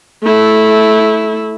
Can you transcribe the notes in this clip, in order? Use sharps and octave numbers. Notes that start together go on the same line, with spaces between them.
A3 E4